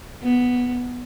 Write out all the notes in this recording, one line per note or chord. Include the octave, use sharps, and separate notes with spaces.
B3